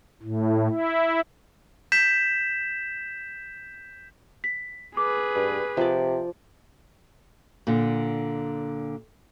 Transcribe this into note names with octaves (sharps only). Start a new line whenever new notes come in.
A2
E4
G6 B6 E7
B6
G#4 B4 D6
G2
C3 F3 D5
A#2 D3